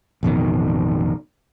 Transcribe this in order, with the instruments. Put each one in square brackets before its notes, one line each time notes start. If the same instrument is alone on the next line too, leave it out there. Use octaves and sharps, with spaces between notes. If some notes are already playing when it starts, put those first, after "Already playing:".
[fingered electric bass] A1 F2 B2 D#3